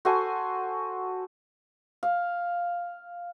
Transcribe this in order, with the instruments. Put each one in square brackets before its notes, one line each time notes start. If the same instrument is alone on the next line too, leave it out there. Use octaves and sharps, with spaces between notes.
[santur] F#4 A4 C5 G#5
[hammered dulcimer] F5